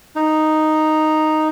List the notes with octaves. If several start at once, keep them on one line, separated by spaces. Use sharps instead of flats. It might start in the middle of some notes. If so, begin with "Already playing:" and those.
D#4